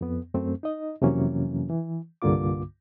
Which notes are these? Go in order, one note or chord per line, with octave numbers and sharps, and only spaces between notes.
F2 B3
F#2 A3 C4
D#4 D#5
F2 C3 E3 F#3 A#3 C#4
E3
C2 G2 D3 A#3 F4 D6